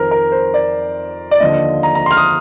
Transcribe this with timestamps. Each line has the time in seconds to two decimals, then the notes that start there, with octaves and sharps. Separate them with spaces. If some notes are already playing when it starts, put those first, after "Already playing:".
Already playing: F2 D#3 A#4 C5
0.11 A#4
0.32 C5
0.54 D5
1.31 D5
1.40 D#2 D3 F3 D#5
1.83 A#5
1.95 A#5
2.06 C6 F6
2.17 D#6